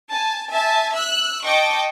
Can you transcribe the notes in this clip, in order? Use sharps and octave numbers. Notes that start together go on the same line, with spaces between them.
G#5 A5
E5 G#5 A5
E6 F#6
D#5 G5 A5 C#6 D6